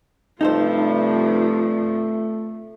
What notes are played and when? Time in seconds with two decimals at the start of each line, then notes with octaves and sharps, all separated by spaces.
0.41 G2 C3 F3 A3 D#4 A4 C5